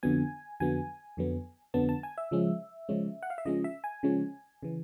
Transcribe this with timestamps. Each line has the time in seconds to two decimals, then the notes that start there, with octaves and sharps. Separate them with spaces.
0.03 F2 D3 F#3 B3 G#5
0.60 F2 D3 F#3 B3 G#5
1.17 F2 D3 F#3 B3
1.74 F2 D3 F#3 B3 A5
1.89 A5
2.03 G#5
2.18 E5
2.31 C#3 F3 G#3 C#4
2.89 C#3 F3 G#3 C#4
3.23 F#5
3.30 F5
3.38 E5
3.45 C#3 F3 G#3 C#4 D#5
3.64 E5
3.84 G#5
4.03 C#3 F3 G#3 C#4
4.63 C#3 E3